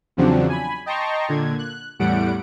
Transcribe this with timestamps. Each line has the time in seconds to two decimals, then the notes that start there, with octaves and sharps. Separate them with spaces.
0.17 E2 C#3 F3 F#3 C4 D4
0.49 G#5 B5
0.86 D#5 G5 A5 A#5 C6 C#6
1.28 A#2 D3 G#6
1.59 F#6
1.99 E2 A2 G3 F#5 D7